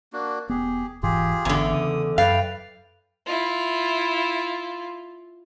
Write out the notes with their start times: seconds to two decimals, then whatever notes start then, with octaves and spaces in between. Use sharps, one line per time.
0.13 A#3 D4 F#4
0.49 E1 B3 G4 G#4
1.03 E1 G#2 E3 F4 G4 G#4
1.45 G#1 E2 D3
1.73 C#3 D#6
2.18 F#2 B4 D5 F5 G5
3.26 E4 F4